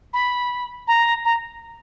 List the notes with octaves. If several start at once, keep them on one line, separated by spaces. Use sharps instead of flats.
B5
A#5
A#5